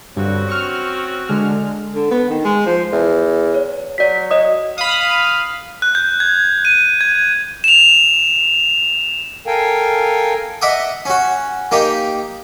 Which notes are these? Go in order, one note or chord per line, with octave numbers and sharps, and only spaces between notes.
G2 D3 C4 C#4 F#4
C#6 F6
D3 G#3 F6
D3
B3
D#3
G#3
F3
E2
C#5
F#3 D5 B6
C#5 D#5 D#6
F5 B5 D#6
F#6
G6
G#6
D#7
G#6
E7 F7
A4 A#4 F5 G5 G#5
D#5 E5 F#5 D6 D#6
C#4 F#4
A#3 D#4 G4